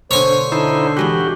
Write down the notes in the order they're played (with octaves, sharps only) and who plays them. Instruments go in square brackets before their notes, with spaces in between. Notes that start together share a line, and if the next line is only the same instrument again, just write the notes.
[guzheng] B2 D3 [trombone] C5 [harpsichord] C#5 G#5
[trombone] D3 [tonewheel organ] D#4 E4 C5 [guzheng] A5
[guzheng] E2 G#3 B5 [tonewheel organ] F#4 G4